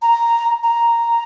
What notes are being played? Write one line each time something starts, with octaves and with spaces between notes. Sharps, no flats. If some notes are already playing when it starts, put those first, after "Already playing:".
A#5
A#5